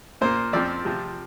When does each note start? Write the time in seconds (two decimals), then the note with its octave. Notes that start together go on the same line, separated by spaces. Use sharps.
0.21 A#2 A#3 C5
0.53 F2 F3 C4 D5
0.85 C3 F3 C4